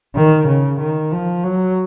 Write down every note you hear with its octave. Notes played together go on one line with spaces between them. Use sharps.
D#3
C#3
D#3
F3
F#3